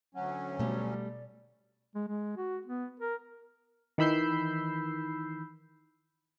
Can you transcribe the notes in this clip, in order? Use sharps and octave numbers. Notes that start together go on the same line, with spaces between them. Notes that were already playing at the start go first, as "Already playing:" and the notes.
D2 F#3 C#4 F#5
B2 G3 A3 D5
G#3
G#3
F#4
B3
A#4
D#3 E3 B5 E6 G6 C7